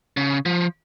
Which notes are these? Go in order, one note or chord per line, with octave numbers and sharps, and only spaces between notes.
C#3
F3